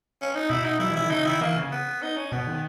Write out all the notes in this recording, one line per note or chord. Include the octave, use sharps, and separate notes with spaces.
C#4
D#4
B2 E4
D#4
F#3 E4
E3
D#3 E4
C#3 D#4
D#3 E4
E3 A#3
C#3
B3
D#4
C#4
B2 B3
D#3